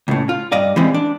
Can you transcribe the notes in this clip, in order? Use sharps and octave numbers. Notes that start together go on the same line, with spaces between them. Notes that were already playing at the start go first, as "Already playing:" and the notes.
C#2 A2
F4
G2 D5 D#5 F5
E3 G3 G#3 C4
D4